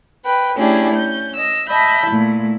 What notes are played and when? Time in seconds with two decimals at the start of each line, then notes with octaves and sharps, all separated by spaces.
0.25 B4 G5
0.56 A3 C#4 D4 E4 G4 G#4
0.95 C#4 G6
1.36 D#5 E6
1.69 D#5 E5 A5 B5 G6
2.06 A#2 A3 E4